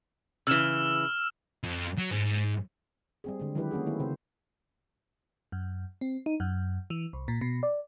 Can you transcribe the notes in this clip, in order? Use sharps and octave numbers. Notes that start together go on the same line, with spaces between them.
C#3 E3 E6 F6 E7
F2
F#3
G#2
G3 C4 G#4
D3 G#3
D#3 F#3 G#3 E4 G4 B4
A#3 C#4 F#4 G#4
D#3 A3 B3 E4
C#3 C4 C5
F#2
C4
D#4
F#2
E3
C2
A#2
B2
D5